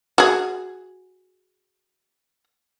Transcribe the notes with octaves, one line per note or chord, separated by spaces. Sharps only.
F#4 G#4